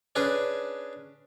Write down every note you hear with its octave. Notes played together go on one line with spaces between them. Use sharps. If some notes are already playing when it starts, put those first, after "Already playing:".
C#4 D4 G#4 B4 C#5